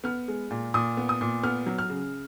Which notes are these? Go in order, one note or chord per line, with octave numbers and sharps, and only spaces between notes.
B3 F6
G#3
A#2
A#2 D#6
B3
D#6
A#2
B3 F6
F#3
F6
C#3